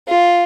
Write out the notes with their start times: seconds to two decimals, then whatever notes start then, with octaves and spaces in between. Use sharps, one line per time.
0.08 F4